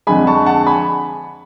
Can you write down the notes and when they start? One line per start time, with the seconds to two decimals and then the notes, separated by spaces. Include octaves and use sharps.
0.07 F2 D3 G#3 G#5 B5
0.27 A5 C#6
0.46 F#5 A5
0.66 G#5 B5